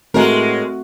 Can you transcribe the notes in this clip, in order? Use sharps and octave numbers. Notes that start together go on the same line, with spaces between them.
A2 G#3 A3 C4 F#4 A#4